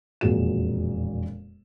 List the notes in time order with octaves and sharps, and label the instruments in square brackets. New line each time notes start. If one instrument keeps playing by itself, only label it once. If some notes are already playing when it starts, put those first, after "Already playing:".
[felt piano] E1 F2 A#2 F#4 G#4 E7